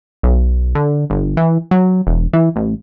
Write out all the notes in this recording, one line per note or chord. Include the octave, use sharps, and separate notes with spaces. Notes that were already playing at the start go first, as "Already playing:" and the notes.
B1
D3
G1
E3
F#3
E1
E3
A1